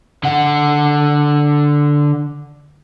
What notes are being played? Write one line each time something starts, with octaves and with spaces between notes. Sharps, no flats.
D3 F#5